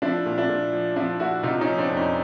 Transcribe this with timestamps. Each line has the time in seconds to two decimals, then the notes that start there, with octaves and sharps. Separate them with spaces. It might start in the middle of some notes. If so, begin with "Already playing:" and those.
0.02 F3 D4 E4
0.26 A#2
0.38 D4 E4
0.49 A#2
0.73 F3
0.96 F3 D4 E4
1.20 A#2 E4 F#4
1.43 C3 D#4 F4
1.61 C#4 D#4
1.68 F3
1.78 C4 D4
1.91 F2
1.97 C#4 D#4